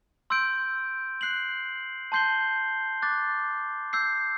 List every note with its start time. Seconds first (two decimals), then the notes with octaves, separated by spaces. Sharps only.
0.30 C6 E6 G6 D7
1.21 F#6 C7 F#7
2.12 A5 C6 G6 C7 G7
3.02 D6 F#6 A6
3.93 E6 G6 C7